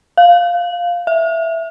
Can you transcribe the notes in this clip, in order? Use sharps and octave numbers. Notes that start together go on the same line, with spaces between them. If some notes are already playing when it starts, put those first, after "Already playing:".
F5
E5